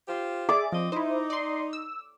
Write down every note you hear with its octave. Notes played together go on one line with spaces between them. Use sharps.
F4 G4 C5
G#4 D5 E5 D6
F3 C4 D#5
D#4 E4 C5
D5 C6
E6